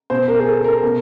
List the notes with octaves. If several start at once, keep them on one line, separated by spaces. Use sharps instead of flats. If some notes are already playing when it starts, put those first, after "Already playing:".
B2 C5
A#4
G#4
A4
A#4
B2